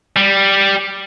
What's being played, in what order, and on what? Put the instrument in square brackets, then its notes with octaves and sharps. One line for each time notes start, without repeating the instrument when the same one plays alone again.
[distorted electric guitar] G3